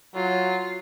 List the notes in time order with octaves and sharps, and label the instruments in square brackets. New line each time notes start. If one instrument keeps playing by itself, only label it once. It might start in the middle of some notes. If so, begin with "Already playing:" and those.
[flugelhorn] F#3 [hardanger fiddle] F4